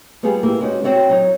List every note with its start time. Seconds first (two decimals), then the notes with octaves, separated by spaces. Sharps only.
0.23 G3 B3 F4 G4 G#4
0.43 A#3 E4 G4
0.61 G#3 C#4 D#4 F#4
0.83 C4 F#4 C#5 E5 G5
1.09 F#3 D#4 C#5